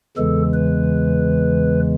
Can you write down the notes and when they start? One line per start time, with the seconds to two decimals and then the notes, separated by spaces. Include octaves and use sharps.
0.17 E2 C#3 E3 G#3 A4
0.54 B4